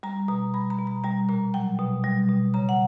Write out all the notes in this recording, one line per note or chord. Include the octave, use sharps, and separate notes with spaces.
G3 A#5
B2 A#5
G3 B5
A#5
B2
A#5
G3 A#5
A#2 A#5
F#3 G5
B2
G3
B2
C#3 A#5
F#5